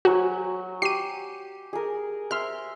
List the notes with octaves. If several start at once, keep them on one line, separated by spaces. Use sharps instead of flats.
F#3 F#4 G#5
G4 C7 D#7
G#4 A#4
E5 C6 F6